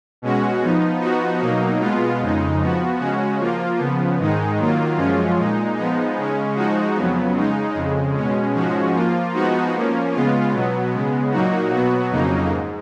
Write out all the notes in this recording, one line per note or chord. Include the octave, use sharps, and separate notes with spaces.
B2 G#3 C#4 F#4
F3 B3 D#4
F3 B3 D#4 F#4
B2 F#3 A#3 D#4
B2 G#3 B3 F4
F2 C#3 G#3 D#4
F3 B3 F#4
C#3 G#3 C#4 F#4
F3 A#3 F4
C#3 F3 B3
G#2 D#3 G#3 D#4
D#3 F#3 A#3 F4
F#2 F3 G#3 C#4 F4
A#2 G#3 D#4
F3 G#3 B3 D#4
C#3 G#3 C#4
F3 G#3 D#4 F#4
F2 C#3 F#3 B3
C#3 G#3 D#4
F2 C#3 G#3
B2 G#3 C#4
G#2 F3 G#3 C#4 F#4
F3 A#3 F4
F3 G#3 B3 D#4 F#4
F3 A#3 C#4
C#3 G#3 B3 F4
B2 F#3 B3
C#3 G#3 B3
A#2 F#3 A#3 D#4 F#4
B2 F#3 B3 F#4
F2 C#3 F#3 A#3 D#4
G#2